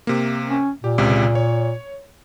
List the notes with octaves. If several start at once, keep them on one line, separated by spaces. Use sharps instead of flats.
C3 A#3
C#4
A#2 G4
C#2 C3
C#5